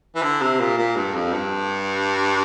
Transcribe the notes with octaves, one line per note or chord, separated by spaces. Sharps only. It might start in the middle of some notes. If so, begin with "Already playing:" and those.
E3
D3
C3
A#2
A#2
G2
F2
G2